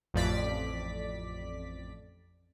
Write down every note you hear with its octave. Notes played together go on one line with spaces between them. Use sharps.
A1 F2 D5 B6